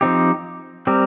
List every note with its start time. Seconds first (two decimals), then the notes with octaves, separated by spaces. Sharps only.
0.01 F3 C4 D#4 G4
0.87 G3 C4 G4 A#4